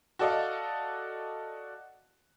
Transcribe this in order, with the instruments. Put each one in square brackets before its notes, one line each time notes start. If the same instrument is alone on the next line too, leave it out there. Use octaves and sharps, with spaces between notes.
[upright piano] F#4 A4 D5 D#5 F5